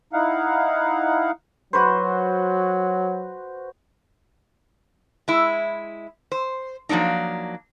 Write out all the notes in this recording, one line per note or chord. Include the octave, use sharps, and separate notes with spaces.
D#4 E4 F5 F#5
F#3 F#4 B4 C5
G#3 E4
C5
F3 F#3 A#3 D4 D#4